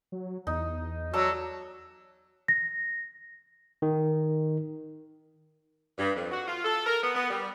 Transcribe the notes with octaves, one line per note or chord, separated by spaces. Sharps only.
F#3
E2 D#4
F#3 A4 D5 A#5
A#6
D#3
G2
F2
F#4
F4
A4
A#4
B3
B3
G3